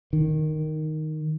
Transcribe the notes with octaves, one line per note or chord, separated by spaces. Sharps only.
D#3